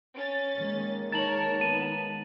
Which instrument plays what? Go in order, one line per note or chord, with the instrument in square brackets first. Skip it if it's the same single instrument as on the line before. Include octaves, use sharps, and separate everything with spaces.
[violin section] C#4 A6
[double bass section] D#3 G#3 A#3
[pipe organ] D#4 A5 [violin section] A#4 C#5 [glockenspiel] A6 F#7
[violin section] B3 [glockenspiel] D#7